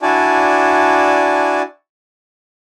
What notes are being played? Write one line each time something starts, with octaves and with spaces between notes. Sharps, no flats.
D4 E4 F#4 D5 G#5 A5